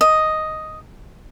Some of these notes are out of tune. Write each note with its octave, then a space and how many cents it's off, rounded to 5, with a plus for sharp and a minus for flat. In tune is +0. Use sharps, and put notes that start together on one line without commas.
D#5 +5